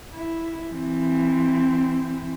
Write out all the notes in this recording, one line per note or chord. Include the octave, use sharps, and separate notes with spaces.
E4
E3 C4